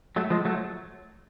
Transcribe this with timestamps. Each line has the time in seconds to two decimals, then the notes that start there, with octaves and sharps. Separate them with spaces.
0.16 F#3 A3
0.30 F3 G#3
0.45 F#3 A3